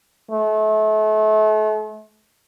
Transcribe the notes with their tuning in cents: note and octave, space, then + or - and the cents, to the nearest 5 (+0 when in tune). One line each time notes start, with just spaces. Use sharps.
A3 -35